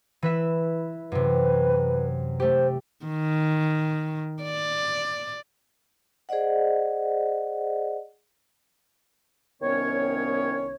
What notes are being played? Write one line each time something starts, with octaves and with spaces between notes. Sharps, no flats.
E3 B4 E5
F#2 C3 B4
A3 G4 C5
D#3
D5
G#4 C5 D5 D#5 F#5
C2 D#3 B3 C#4 C#5